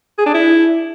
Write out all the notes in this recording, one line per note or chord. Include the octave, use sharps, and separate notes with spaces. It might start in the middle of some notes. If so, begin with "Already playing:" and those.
G#4
D4
E4